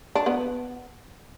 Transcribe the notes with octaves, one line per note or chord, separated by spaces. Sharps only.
D4
B3